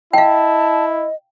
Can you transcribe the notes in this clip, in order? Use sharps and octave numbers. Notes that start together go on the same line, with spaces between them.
E4 D#5 F5 G5 A5